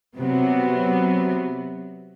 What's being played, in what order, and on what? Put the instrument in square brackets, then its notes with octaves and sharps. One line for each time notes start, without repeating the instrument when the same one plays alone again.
[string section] C3 F#3 B3